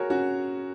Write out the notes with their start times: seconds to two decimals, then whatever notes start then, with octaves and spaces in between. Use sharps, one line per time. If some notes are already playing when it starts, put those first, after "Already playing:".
Already playing: F#4 G#4 A#4 C#5
0.10 C#4 F#4